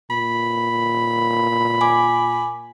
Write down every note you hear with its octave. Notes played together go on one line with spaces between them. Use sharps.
A#2 B5
G#5 D6